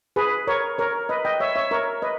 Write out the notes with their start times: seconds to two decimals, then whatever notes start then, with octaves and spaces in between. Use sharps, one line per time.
0.16 G#4 B4
0.47 A#4 C#5
0.78 A#4 C#5
1.09 B4 D#5
1.25 D#5 G5
1.40 C#5 E5
1.56 C#5 E5
1.71 A#4 C#5
2.02 B4 D#5